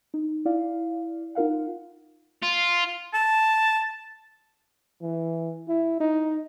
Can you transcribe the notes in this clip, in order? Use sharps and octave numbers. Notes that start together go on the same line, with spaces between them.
D#4
E4 D5 F5
D#4 F4 A#4 F5 F#5
F4
A5
E3
E4
D#4